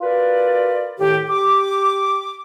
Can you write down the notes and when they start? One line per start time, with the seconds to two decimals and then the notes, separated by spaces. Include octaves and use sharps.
0.01 F4 F#4 A#4 B4 D5
0.99 A2 D#3 G4
1.28 G4 D6